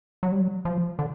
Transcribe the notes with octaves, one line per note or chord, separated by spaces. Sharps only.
F#3
G3
F#3
F3
D3